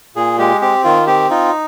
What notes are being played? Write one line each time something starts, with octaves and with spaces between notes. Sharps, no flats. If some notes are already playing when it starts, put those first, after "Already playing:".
A#2 G#4
G#3 G4
C4 G4
D#3 F4
C4 G4
D#4 F4